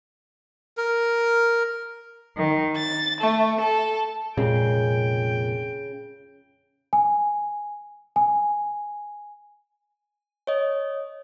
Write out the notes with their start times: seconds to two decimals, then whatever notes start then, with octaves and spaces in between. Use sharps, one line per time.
0.77 A#4
2.37 D#3
2.76 A6
3.21 A3
3.60 A4
4.37 F1 A#2 C#3 G#3 G5
6.93 G#5
8.16 G#5
10.47 C#5 D#5